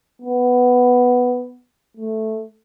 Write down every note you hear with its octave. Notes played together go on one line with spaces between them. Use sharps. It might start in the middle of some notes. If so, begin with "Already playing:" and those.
B3
A3